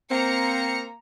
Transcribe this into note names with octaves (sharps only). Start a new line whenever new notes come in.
A#3 C4 A#5 C#7